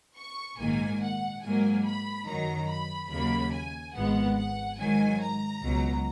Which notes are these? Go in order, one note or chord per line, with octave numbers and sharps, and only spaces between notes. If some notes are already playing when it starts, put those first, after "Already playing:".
C#6
A#1 G#2 D#3 A#3 G#5
F#5
G#2 F#3 A#3 G#5
B5
F#2 D#3 F#3 A#5
B5
D#2 C#3 F#3 A#3 B5
G#5
G#1 G#2 F3 G#3 B3 F#5
F#5
G#2 D#3 F#3 G#5
A#5
C#2 B2 F#3